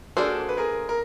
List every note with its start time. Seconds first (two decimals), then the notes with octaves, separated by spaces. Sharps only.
0.17 A#3 D4 F4 F#4 G#4 A4 C5
0.49 B4
0.57 G#4 A#4
0.89 A#4